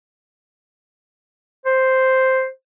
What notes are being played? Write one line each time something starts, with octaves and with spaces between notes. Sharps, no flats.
C5